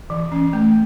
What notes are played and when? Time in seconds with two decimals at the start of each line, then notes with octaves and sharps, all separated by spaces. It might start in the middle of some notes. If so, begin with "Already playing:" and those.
0.10 E3
0.32 C#4
0.53 A3